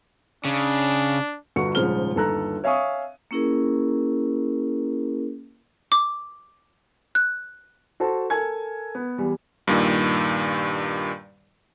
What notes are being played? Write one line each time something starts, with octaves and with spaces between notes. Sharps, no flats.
C#3 D4
G1 D3 F#4 C#6 C#7
D#1 G#2 C#3 F3 F6 G7
G1 D#2 A4 A#5 F#6
C#5 E5 F5 G#5 C#6 D#6
A#3 C#4 E4 G#4 A#4
D6
F#6
F#4 A4 C5 A5
A4 A#4 G#5 G#6
B3
E2 G3
G2 A#2 D#3